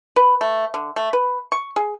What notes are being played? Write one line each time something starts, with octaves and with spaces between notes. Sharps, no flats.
B4
A3
D3
A3
B4
C#6
G#4